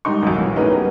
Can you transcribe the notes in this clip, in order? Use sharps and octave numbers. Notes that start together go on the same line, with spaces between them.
G#2 G3 D#4 C#6
A1 F#2
B1 E3
A3 C#4 D#4 G#4 A#4 B4
F#3 G3 A#3 B3 C#4